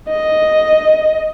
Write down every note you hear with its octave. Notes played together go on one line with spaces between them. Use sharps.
D#5